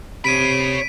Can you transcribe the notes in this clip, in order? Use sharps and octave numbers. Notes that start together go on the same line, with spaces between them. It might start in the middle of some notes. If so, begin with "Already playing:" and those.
C3 C#5 B5 B6 D7 D#7